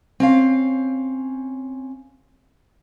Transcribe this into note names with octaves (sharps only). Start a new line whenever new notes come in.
C4 C#4 F5